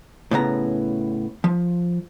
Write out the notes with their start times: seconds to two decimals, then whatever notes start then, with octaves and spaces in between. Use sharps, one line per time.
0.31 A2 C#3 B3 A#5
1.44 F3